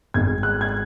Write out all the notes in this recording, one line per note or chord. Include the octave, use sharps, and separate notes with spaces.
G#1 G#2 G#3 G#6
F#6
G#6